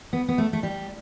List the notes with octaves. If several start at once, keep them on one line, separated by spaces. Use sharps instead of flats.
B3
B3
A3
A3
G3